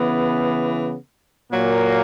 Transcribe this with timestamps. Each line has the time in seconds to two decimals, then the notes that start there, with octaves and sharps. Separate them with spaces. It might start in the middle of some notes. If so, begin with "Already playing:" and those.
Already playing: C#3 E3 B3
1.52 A#2 F#3 A#3